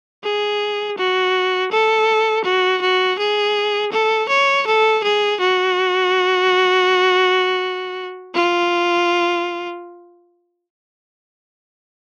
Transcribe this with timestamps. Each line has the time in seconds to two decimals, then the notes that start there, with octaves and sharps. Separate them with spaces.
0.24 G#4
0.98 F#4
1.72 A4
2.45 F#4
2.82 F#4
3.18 G#4
3.92 A4
4.29 C#5
4.67 A4
5.03 G#4
5.40 F#4
8.35 F4